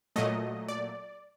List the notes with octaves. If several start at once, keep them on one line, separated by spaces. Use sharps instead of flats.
A#2 F#3 A3 D#5
D5